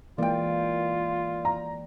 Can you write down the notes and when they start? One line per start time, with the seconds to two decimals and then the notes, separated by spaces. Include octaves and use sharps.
0.18 E3 G#3 A#3 F4 D5 G5
1.45 A#5